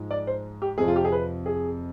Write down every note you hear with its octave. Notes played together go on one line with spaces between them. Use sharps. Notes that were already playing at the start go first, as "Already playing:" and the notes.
Already playing: G#2 F3 G#3
D5
C5
G4
F2 C3 F3 G#4
F4
G4
G#4
B4
G#4